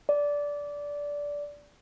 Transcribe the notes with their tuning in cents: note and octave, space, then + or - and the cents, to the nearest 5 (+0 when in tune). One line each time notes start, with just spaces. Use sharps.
D5 -15